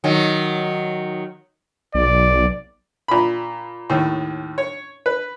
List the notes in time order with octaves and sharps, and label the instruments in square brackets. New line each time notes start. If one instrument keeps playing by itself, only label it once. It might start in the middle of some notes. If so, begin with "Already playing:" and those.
[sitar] D#3 F#3
[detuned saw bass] B1 [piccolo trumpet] D5
[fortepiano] A#2 B5
D#2 A2
C#5
B4